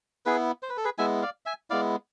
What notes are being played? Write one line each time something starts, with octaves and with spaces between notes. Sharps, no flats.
B3 E4 G#4 B4
C5
B4
A4
G#4 B4
G#3 B3 E4 E5 G#5
D5 F5
E5 G#5
G#3 B3 E4 D5 F5